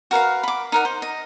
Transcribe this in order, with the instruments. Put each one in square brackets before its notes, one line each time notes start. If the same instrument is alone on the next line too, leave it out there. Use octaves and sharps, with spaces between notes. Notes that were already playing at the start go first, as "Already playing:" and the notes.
[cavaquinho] F#4 A#4 B4 F5
B5 D6
D#4 A#4 F#5
C5
D#5